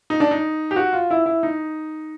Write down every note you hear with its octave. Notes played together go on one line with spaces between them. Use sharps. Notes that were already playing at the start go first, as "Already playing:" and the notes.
D#4
D4
D#4
G4
F#4
F4
E4
E4
D#4